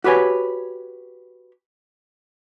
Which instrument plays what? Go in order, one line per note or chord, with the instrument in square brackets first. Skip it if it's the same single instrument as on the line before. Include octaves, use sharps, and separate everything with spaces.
[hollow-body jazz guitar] F#4 G4 B4 C#5 G#5